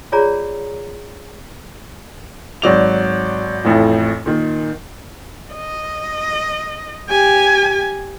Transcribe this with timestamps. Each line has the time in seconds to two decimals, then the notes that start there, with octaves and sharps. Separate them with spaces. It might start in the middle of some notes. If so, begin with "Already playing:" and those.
0.12 F4 G#4 C#5 D5 A#5
2.62 G#1 F#3 D5 F7
3.65 A1 F2 A2 E3
4.26 A#2 D#3
5.54 D#5
7.09 G4 G#5